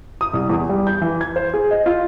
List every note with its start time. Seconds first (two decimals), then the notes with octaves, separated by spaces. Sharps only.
0.21 D#6
0.33 C2
0.49 E2
0.69 G3
0.87 G6
1.01 E3
1.21 G#6
1.36 C5
1.54 G#4
1.71 D#5
1.86 F4